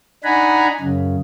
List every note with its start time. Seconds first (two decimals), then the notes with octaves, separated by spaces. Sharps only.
0.24 D4 D#4 F#5 G#5 A#5 B5
0.80 F#2 C#3